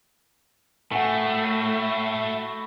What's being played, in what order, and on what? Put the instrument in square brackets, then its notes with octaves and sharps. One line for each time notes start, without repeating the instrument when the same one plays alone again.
[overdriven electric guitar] A2 [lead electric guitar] A3 [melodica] E4 F#4 A4 [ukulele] F#5 G#5 A5